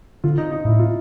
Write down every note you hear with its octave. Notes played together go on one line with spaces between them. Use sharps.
D3 F4
D#4
D#4
A2 E4
F4